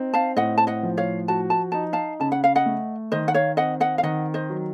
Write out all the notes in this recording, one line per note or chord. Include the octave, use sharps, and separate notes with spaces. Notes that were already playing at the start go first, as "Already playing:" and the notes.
Already playing: C4 D#4
F5 A5
A2 D#5 F#5
A5
D#5 F#5
F3
C#5 F5
F#4 A5
A5
D#4 A5
F5 A5
C#3 A5
F#5
F5
D#5 F#5
A3
D#3 C5 D#5
F#5
C#5 F5
C4 D#5 F#5
D#5 F#5
F5
D#3 D#5 F#5
C5 D#5
F#3